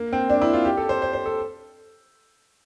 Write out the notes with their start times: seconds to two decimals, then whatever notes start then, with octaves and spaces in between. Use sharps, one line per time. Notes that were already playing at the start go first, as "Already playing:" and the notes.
Already playing: A#3
0.13 C4
0.30 D4
0.42 E4
0.53 F4
0.65 G4
0.77 A4
0.89 C5
1.02 C5
1.13 C5
1.26 A4